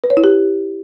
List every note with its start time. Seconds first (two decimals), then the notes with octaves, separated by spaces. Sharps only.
0.04 B4
0.10 C#5
0.17 E4
0.24 G4